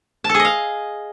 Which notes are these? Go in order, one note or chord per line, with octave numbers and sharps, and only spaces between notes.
A5
A4
G#4
D#5
F5